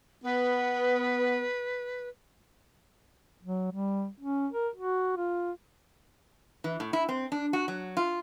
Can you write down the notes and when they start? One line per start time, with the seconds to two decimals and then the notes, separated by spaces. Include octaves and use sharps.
0.24 B3 B4
3.43 F#3
3.72 G3
4.20 C#4
4.53 A#4
4.76 F#4
5.16 F4
6.64 E3
6.80 A2
6.93 E4
7.09 C4
7.32 D4
7.53 F#4
7.68 F#3
7.97 F4